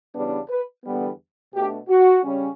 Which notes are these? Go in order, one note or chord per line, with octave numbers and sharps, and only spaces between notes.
E2 C#3 G3 B3 D4
B4
E2 D3 G3 B3
B2 A3 D4 G4
F#4
C#3 G3 C#4